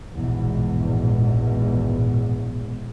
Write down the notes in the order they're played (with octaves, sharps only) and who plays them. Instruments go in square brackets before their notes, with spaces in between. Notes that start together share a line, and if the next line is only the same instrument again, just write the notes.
[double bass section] A#1 E2 G#2 B2